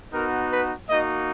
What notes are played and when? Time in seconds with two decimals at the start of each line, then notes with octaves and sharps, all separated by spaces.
0.13 B3 D#4 F#4 A#4
0.51 B4
0.89 A#3 D#4 F#4 D#5